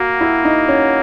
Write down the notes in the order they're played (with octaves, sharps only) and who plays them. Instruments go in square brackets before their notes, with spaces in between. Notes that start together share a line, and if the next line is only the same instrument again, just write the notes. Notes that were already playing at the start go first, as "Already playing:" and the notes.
Already playing: [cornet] A#3 [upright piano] F#4
[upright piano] E4
D#4
C#4